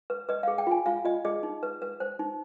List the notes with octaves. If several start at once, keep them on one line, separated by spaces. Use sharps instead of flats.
B4
B4 D#5
G#4 F5
G5
F4 G#5
F4 F5
F4 D#5
G#4 D#5
D#4
B4
B4
C5
D#4